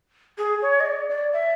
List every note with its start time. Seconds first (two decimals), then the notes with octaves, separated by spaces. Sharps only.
0.38 G#4
0.62 C#5
0.80 D#5
0.86 D5
1.10 D5
1.33 E5